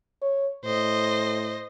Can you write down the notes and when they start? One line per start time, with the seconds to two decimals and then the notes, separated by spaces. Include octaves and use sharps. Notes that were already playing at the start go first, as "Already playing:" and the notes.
0.22 C#5
0.65 A2 C5 D#5